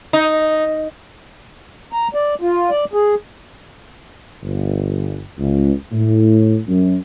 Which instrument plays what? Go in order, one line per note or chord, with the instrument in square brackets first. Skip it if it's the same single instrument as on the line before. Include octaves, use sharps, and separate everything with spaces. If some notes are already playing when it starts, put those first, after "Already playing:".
[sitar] D#4
[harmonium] A#5
D5
F4
D5
G#4
[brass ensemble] G1
C#2
A2
F#2